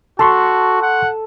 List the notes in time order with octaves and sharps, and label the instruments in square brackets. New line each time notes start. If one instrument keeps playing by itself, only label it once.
[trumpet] F#4 [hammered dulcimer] A4 [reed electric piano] A5 C6 C#6
[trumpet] F#5